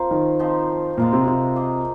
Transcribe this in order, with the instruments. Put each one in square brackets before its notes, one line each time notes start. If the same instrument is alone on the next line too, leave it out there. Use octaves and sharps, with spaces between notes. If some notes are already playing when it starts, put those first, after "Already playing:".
Already playing: [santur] F3 C4 F4 A#4 F5
[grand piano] D#3
[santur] F3 C4 D#4 C5
[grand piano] A#2 [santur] G#3 F4 A#4 F5
[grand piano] C3
C3
[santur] A#3 G#4 D#5